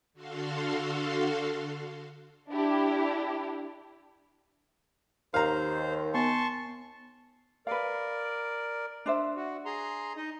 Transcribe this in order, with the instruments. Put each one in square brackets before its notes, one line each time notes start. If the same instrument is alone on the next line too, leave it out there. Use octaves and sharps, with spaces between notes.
[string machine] D3 F#4 A4 F5 C6
[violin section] D4 E4 G4
[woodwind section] D#2 [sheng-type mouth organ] C5 [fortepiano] F5 A#5
[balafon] B3 G#5 [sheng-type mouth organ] A5 C6 C#6
[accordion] A#4 D5 [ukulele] B4 F5
[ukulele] D4 C5 E5
[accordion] F#4
G#4 A#5 C6
D#4 D#5